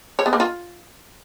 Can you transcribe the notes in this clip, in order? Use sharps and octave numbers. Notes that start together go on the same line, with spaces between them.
C#5
B3
A#3
F4